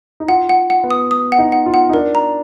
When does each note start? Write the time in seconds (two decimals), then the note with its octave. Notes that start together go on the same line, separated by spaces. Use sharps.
0.20 D#4
0.28 F4 F#5
0.49 F#5
0.70 F#5
0.84 B3
0.91 D#6
1.11 D#6
1.32 F#5
1.38 D#4
1.52 F#5
1.66 F4
1.74 F#5
1.89 D#4
1.94 D4 A#4
2.15 A#5